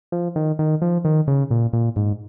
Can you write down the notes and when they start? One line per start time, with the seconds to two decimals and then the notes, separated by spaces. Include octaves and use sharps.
0.12 F3
0.36 D#3
0.59 D#3
0.82 F3
1.05 D#3
1.28 C#3
1.51 A#2
1.73 A#2
1.96 G#2